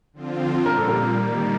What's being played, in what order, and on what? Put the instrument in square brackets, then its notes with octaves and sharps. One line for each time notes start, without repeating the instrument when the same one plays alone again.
[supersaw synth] D3 F3 C4 F4
[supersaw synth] A#2 G3 A#3 [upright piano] A#4
[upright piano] A4
A#4
[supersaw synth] D#3 G3 A#3